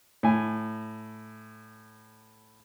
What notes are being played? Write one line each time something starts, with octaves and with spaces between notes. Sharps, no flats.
A2 G#5